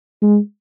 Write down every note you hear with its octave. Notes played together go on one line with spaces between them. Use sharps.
G#3